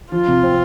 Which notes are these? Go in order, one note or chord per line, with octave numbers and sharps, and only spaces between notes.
F3 F4
C3
C4